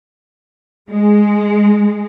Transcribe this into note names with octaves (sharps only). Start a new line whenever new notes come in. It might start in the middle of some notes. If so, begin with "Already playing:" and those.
G#3